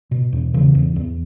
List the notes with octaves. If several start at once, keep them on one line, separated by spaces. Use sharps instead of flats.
B2
E2
C#3 E3
E2
E2